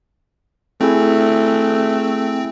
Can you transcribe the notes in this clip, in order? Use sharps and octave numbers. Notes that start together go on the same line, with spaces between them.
A3 C4 E4 G#4